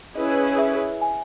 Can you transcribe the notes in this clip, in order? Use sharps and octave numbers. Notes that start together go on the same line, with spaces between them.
C#4 E4 G#4 B4 D#5
E5
G#5